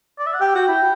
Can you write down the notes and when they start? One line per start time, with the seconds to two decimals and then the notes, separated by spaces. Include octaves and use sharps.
0.19 D5
0.27 E5
0.34 F#5
0.41 G4 G5
0.55 F#4 G5
0.68 E4